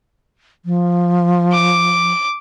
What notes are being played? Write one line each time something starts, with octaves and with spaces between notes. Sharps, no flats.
F3
D6